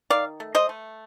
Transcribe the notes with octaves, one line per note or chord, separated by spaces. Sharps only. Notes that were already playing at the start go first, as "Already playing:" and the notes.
D#3 D5 F5
A3
C5 D#5
A3